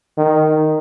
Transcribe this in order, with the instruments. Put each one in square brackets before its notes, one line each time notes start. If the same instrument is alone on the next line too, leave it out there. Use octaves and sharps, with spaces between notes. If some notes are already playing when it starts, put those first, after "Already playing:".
[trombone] D#3